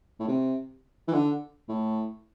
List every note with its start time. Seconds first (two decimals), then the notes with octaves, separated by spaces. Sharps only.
0.20 A2
0.28 C3
1.08 E3
1.13 D3
1.69 A2